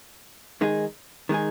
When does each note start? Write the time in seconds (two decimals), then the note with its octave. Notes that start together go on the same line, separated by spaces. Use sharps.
0.61 D#3 G#3 D#4 G#4
1.29 D#3 G#3 D#4 G#4